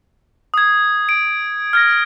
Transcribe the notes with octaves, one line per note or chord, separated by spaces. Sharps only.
D#6 G#6
D7
F6 G#6 A#6